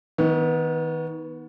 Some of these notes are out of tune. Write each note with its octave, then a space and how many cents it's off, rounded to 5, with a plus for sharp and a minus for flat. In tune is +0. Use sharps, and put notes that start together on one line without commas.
D#3 +30 B3 -5